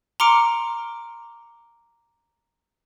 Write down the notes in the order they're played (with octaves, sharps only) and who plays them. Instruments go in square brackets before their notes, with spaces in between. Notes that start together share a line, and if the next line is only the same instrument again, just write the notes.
[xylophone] A#5 C6 D6 F6 C#7 D7